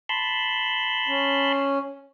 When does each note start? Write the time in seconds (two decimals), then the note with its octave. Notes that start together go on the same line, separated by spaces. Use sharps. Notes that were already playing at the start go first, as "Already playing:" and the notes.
0.09 A5 B5 C6
1.08 C#4